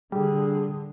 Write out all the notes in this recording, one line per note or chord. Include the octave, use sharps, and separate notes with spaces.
D3 G3 G#4